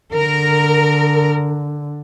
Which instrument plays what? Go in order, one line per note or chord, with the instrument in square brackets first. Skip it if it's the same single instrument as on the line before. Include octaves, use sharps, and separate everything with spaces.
[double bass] D3 [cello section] A#4